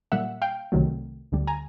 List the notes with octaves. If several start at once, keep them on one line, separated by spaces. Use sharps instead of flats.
A#2 G3 A#3 E5 F#5
F5 G5
C2 C3 D#3 F#3 A3
D2 D3 G3
G#5 A#5